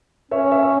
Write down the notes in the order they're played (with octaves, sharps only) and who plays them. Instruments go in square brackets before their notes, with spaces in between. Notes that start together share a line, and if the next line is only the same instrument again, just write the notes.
[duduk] C#4 [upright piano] C#5 E5
[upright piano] C#5 E5
E5